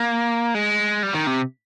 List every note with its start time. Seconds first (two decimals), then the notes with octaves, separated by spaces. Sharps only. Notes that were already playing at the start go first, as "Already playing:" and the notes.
Already playing: A#3
0.55 G#3
1.03 G3
1.14 D#3
1.27 C3